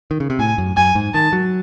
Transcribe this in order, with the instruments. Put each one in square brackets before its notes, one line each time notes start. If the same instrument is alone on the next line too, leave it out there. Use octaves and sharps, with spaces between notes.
[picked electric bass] D#3
C#3
C3
[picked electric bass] A2 [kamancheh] G#5
[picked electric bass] F#2
[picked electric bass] F#2 [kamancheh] G#5
[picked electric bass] G#2
[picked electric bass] D#3 [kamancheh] A5
[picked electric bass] F#3